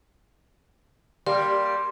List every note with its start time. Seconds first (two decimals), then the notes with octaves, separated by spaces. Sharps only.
1.27 G3 A#3 C6